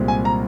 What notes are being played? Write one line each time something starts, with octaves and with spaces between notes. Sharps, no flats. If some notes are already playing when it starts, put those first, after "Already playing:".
Already playing: C2 A#2 G#3 C4
G#5
A#5